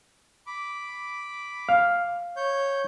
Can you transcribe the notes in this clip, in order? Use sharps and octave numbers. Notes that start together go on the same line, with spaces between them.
B5 D6
F5
C#5 G6